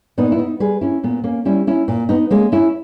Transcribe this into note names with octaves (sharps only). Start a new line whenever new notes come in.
A#2 B3 D#4
E4
B3 D#4
G3 G#4 B4
C#4 E4
A#2 B3
A#3 C#4
G3 C#4 E4
C#4 E4
A#2
B3 D#4
G#3 A#3 C#4
C#4 E4